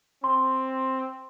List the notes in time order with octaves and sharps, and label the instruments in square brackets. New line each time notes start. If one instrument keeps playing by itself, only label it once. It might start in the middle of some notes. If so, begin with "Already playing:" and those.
[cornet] C4 [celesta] C6